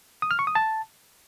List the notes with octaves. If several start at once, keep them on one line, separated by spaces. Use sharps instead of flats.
D#6
F6
C#6
D#6
A5